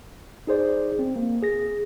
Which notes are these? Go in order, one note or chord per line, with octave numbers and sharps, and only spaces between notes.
D#4 G#4 C5 D5
C4
A#3
G#4 A#6